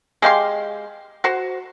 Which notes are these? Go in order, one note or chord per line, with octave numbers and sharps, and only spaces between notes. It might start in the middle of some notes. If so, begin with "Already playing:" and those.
G#3 G4 F5 C6
F#4 C5